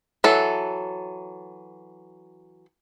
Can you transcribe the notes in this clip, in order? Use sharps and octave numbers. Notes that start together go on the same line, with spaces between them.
E3 F#3 A4